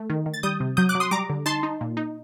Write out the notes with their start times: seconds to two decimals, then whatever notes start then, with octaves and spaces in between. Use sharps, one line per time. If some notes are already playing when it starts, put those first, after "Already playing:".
Already playing: A3
0.10 D#3
0.26 D#3
0.34 A6
0.43 G3 D#6 G6
0.60 C3
0.77 F#3 D#6 G6
0.89 D6 F#6
0.95 F#3
1.00 C6 D#6
1.11 G3 A#5 D6
1.30 D3
1.46 D#4 A5 C6
1.63 D#4
1.81 A#2
1.97 D#4